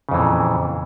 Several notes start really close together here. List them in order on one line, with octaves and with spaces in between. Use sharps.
C#3 F2 E3 A#2